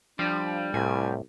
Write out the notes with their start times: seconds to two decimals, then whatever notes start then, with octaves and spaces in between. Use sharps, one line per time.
0.19 F3 G3 D4
0.74 C2 A2 G#5